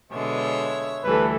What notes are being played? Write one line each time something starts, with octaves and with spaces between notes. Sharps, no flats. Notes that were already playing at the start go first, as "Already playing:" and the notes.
B2 D3 G#3 C#5 E5
D2 E3 G3 A4 B4